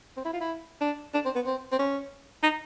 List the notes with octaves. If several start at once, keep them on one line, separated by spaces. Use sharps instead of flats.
C4
E4
F4
E4
D4
D4
C4
B3
C4
C4
C#4
D#4